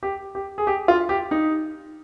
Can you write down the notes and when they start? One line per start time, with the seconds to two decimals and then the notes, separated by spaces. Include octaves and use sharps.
0.03 G4
0.35 G4
0.58 G#4
0.67 G4
0.88 F4
1.09 G4
1.31 D#4